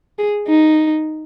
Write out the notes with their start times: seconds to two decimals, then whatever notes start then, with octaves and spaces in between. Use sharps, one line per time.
0.19 G#4
0.47 D#4